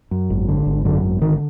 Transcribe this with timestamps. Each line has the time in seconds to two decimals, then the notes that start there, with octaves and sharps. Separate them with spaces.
0.11 F#2
0.30 G#1
0.48 D3
0.66 G#1
0.85 F#2 D3
1.04 G#1
1.22 D3 D#3